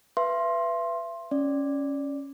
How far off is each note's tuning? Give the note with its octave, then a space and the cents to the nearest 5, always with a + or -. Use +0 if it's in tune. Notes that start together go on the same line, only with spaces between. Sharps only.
B4 +0 E5 +40 C6 +15
C#4 +0 D5 +0